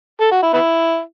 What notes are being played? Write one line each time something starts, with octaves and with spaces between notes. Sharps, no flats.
A4
F#4
E4
B3 E4